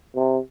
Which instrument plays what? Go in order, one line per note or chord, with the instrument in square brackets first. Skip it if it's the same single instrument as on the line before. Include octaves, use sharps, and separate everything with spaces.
[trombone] C3